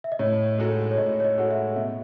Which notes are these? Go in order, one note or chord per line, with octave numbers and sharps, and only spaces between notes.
E5
D#5
A2 C#5
G#3 D#4 F#4 A4
C#5
A2 D#5
C#5
D#5
G#3 D#4 F#4 A4 F#5
E5
B2 E5